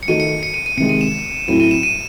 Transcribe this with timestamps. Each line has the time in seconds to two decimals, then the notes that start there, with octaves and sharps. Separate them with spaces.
0.03 C#7
0.08 D#3 A3 D#4 F#4 D#7
0.20 C#7
0.43 C#7
0.54 D#7
0.66 D#7
0.77 C3 D#3 G#3 C#7
0.89 D#7
1.01 E7
1.48 A2 F#3 C4 E4 D#7
1.60 D#7
1.71 E7
1.83 D#7